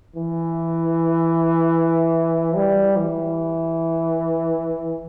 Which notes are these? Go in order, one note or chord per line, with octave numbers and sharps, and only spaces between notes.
E3
G3
E3